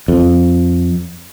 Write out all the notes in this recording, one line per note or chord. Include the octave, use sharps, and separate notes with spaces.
F2